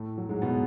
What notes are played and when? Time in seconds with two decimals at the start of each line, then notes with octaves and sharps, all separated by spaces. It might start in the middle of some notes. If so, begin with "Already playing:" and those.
Already playing: A2 A3
0.18 F#3
0.29 G#2 G#3
0.42 B2 B3